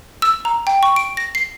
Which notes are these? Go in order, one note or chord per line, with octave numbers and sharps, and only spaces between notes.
E6
A#5
G5
C#6
D7
A#6
C7